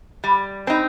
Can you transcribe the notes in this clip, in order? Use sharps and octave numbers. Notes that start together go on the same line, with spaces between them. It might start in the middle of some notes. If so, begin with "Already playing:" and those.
G3
C4 D#4